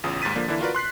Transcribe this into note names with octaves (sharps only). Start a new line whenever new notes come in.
A1 E2 C#3 F4 D#6
D#2 G#2 A6 B6 D#7
D3 F3 A#3 D4
D3 E3 A#3 D4 E4
F4 F#4 A#4 B4 D5
C6 F#6 B6 C7